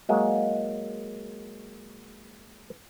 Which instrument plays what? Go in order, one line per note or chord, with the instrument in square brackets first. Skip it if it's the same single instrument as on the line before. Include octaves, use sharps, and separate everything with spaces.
[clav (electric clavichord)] F#3 G#3 A#3